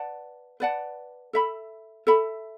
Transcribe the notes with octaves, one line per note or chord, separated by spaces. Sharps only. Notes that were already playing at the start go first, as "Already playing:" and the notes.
Already playing: B4 D5 F#5 A5
B4 D5 F#5 A5
A4 E5 B5
A4 E5 B5